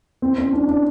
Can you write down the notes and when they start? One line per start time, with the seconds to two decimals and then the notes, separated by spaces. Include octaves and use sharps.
0.22 C4
0.38 C#4
0.52 D4
0.68 D4